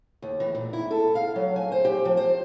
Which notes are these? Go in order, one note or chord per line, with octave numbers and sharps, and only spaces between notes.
D#2
E3
A#2
E4
A4
F5
F#3
G#5
C5
G4
F3
C5